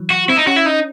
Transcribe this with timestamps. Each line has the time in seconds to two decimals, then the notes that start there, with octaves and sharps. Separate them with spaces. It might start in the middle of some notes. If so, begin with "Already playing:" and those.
Already playing: E3 F#3
0.10 F#4
0.28 C4 E4
0.38 D#4
0.47 C#4 F#4
0.56 E4
0.66 D#4